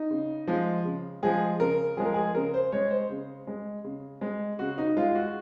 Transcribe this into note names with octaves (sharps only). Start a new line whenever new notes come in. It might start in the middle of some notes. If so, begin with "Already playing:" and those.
Already playing: D#4
C#3
F3 G#3
C#3
F3 G#3 G#4
C#3 A#4
F3 G#3 G#4
A#4
G#4
C#3 A#4
C5
G#3 C#5
C5
C#3
G#3
C#3
G#3
C#3 F#4
D#4
G#3 F4
F4
F#4